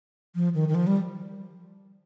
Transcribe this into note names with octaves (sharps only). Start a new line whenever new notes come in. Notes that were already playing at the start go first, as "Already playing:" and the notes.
F3
D#3
D#3
F3
G3